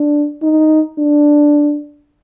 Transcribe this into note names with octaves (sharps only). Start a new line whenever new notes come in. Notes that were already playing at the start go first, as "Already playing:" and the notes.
Already playing: D4
D#4
D4